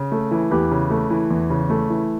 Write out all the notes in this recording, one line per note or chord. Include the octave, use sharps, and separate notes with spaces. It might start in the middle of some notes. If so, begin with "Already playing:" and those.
Already playing: C#3
A3
E3
E2 G4 B4
C#3
A3
E3
E2
C#3
A3
E3